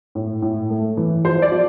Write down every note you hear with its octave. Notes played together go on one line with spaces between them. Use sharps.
A2
A2
A3
E3
F3 C5
D5
F3